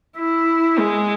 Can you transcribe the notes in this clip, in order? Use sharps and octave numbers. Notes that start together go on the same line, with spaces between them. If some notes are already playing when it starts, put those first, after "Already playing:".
E4
G#3